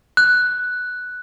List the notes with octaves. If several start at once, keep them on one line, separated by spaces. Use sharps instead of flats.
F#6